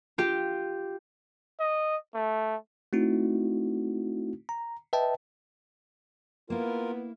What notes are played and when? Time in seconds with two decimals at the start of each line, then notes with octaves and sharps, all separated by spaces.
0.18 F4 G4
1.60 D#5
2.15 A3
2.93 A3 C4 D#4 E4 F#4
4.49 A#5
4.93 B4 D#5 E5 G5 A5
6.50 A#3 B3 E4 F4 A#4